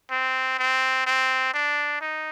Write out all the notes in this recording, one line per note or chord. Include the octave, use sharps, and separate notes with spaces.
C4
C4
C4
D4
D#4